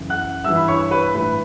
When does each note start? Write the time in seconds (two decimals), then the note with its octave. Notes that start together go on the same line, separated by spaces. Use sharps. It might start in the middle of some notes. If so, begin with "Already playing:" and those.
Already playing: F#2 C#3 E3
0.10 F#5 F#6
0.44 G2 E3 E5 E6
0.56 B5
0.68 C#5 C#6
0.91 B4 B5
1.14 A2 E3 B4 B5